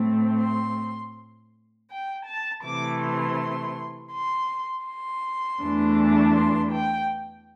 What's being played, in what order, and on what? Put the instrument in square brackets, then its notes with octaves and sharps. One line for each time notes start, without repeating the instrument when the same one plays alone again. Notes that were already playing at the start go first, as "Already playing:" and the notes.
Already playing: [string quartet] A2 A3 C4
C6
G5
A5
C3 E3 A3 D6
C6
C6
C6
E2 E3 A3 D4
C6
G5